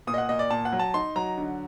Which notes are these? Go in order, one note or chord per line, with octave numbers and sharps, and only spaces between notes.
A#2 D#6
D#5
F#5
A#2 D#5
D5
A#2 A5
F#5
F#3
A5
D#4 C6
F#3 A#5
D3